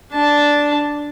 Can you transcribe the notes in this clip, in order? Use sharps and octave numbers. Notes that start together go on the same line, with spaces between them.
D4 A5